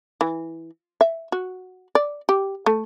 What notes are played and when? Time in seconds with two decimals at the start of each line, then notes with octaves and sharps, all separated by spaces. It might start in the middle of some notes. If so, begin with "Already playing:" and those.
0.21 E3
1.01 E5
1.32 F#4
1.95 D5
2.29 G4
2.66 A3